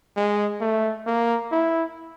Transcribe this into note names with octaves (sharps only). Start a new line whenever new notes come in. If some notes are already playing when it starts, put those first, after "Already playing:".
G#3
A3
A#3
E4